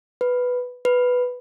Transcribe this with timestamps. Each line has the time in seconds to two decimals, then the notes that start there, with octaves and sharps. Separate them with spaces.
0.21 B4
0.85 B4